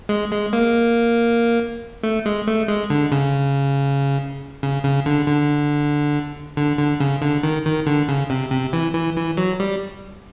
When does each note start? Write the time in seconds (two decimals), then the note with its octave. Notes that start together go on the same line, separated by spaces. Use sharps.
0.09 G#3
0.31 G#3
0.53 A#3
2.03 A3
2.26 G#3
2.47 A3
2.68 G#3
2.90 D3
3.12 C#3
4.63 C#3
4.84 C#3
5.06 D3
5.28 D3
6.57 D3
6.78 D3
7.00 C#3
7.22 D3
7.43 D#3
7.65 D#3
7.87 D3
8.08 C#3
8.30 C3
8.51 C3
8.73 E3
8.95 E3
9.16 E3
9.37 F#3
9.60 G3